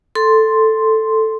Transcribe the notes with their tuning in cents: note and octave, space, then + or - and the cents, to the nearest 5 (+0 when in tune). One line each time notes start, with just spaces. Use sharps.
A4 +0 C6 +0